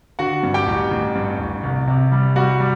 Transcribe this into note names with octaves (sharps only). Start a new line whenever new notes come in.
D3 F#4 F#5
G2
G4 G5
A1
A1
G2
A1
C2
C3
G3
G3 F#4 F#5
G3